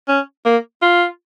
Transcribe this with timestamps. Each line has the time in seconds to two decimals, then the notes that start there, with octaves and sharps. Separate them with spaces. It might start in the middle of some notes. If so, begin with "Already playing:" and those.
0.08 C#4
0.45 A#3
0.82 F4